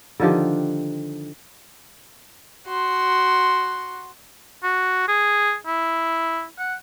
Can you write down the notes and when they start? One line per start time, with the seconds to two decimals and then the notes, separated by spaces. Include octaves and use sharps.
0.20 D3 D#3 F3 G4
2.67 F#4 C6
4.63 F#4
5.08 G#4
5.66 E4
6.58 F#5